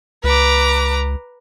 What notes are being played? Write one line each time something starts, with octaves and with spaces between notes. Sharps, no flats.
C#2 B4 A#5 D6